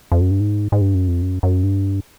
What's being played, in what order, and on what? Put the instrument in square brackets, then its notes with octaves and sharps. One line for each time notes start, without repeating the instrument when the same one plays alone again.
[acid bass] F2
F#2
G2
G#2
G#2
G2
F#2
F2
F#2
F#2
G2